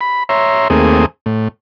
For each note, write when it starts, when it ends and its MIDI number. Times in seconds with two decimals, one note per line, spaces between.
0.01 0.23 83
0.29 0.68 73
0.29 0.68 76
0.29 0.68 82
0.29 0.68 84
0.70 1.06 39
0.70 1.06 57
0.70 1.06 58
0.70 1.06 60
0.70 1.06 68
0.70 1.06 87
1.26 1.48 45